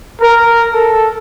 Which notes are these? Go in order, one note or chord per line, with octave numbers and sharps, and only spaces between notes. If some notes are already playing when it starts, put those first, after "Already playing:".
A#4
A4